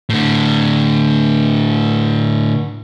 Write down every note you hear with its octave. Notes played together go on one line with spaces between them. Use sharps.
A2 D3